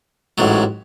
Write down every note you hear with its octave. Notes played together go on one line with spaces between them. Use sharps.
A1 G#2 F#3